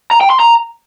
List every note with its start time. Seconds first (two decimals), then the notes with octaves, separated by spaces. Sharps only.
0.11 A#5
0.21 G5
0.30 C6
0.40 A#5